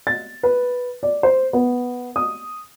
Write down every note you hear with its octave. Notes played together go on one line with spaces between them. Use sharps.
A6
B4
D5
C5
B3
D#6